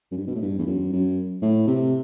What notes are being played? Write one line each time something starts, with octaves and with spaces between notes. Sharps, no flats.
F#2
G2
B2
A2
G2
E2
F#2
F#2
A2
C3